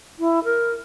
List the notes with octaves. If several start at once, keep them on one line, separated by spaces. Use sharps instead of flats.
E4
A#4